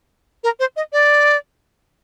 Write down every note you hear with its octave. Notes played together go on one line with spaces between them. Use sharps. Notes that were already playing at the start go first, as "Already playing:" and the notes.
A#4
C5
D#5
D5